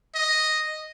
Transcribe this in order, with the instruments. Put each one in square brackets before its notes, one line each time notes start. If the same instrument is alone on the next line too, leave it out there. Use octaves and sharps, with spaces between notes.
[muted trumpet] D#5